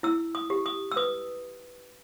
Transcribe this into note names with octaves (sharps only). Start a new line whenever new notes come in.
E4 E6
D#6
G4
D#6
E6
B4 D#6